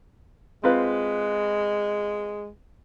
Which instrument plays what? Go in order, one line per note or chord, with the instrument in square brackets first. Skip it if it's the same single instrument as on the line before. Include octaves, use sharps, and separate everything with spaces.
[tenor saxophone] G#3 [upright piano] C4 F4 B4